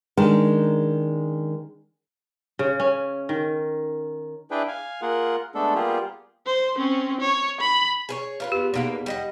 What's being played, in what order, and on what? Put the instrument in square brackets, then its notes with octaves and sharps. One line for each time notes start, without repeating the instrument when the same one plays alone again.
[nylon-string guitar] D#3 G#3 C#4 D4
[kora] C#3
C#4
D#3
[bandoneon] D4 E4 G#4 B4 G5
F5 G#5
A#3 F4 G#4 A#4 F#5
G#3 A3 B3 D4 A4
G3 A#3 B3 F4 G4 G#4
[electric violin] C5
C4 C#4
C#5
B5
[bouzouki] G#4 B4 C#5
F4 A#4 B4
[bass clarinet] E2 [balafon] G4
[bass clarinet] E2 [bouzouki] B2 A#3 B3 [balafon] D#4 F5
[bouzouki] G3 D#5 F#5